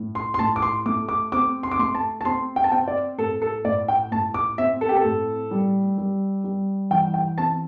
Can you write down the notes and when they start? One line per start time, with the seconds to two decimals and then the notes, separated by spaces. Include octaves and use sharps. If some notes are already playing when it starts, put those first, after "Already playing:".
Already playing: A2
0.15 C6
0.34 C6
0.39 A2 A5
0.56 D6
0.62 C6
0.86 A3 D6
1.09 D6
1.32 C4 D6
1.63 C6
1.71 D6
1.79 A3 C6
1.95 A5
2.21 A5
2.25 C4 C6
2.56 G5
2.64 A5
2.72 C4 G5
2.88 D5
3.18 A2 A4
3.42 A4
3.65 A2 D5
3.88 G5
4.11 A2 A5
4.34 D6
4.58 C4 E5
4.81 A4
4.89 G4
4.96 A4
5.04 A2
5.51 G3
5.98 G3
6.44 G3
6.91 E3 G5
7.14 G5
7.38 C4 A5